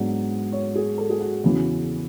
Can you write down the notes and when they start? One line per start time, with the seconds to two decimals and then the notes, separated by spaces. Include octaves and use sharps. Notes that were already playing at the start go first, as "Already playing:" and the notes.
Already playing: G#2 F#3 B3 D4
0.52 C#5
0.75 G#4
0.98 A4
1.10 G#4
1.21 F#4
1.44 E2 C#3 E3 F#4